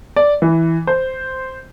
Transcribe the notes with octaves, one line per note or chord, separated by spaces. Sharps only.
D5
E3
C5